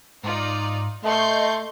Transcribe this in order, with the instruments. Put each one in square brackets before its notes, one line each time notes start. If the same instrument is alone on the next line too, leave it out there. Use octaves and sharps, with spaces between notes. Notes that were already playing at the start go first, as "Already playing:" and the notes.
[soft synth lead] G#2 [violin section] D#4 F4 D5
[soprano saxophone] A3 [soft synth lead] D#5 [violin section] C6 C#6 G6